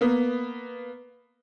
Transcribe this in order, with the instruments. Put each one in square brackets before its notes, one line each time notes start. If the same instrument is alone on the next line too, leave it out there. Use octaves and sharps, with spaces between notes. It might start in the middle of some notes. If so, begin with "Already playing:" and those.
[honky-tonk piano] A#3 B3